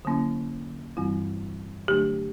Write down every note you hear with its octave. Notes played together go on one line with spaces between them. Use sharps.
D3 F#3 A#3 C#4 E4
G2 E3 G3 C4 E4
D3 F#3 A3 D4 G4